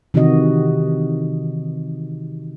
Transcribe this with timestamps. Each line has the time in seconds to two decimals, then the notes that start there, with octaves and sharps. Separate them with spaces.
0.14 C3 D#3 E3 D#4 F#4 D#5